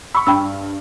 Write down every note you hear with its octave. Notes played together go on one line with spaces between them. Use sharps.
B5 C#6 E6
G2 G5 B5 E6